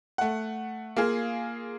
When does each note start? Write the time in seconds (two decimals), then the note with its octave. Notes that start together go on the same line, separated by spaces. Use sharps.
0.18 A3 F#5
0.97 A#3 F4 G#4